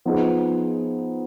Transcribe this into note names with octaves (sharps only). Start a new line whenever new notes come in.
F3 B3 D#4 G#4